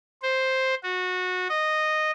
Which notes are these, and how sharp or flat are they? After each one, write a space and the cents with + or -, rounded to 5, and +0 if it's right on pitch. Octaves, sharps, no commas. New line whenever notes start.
C5 +5
F#4 -20
D#5 -10